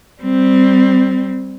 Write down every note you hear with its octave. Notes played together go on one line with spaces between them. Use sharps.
G3 C4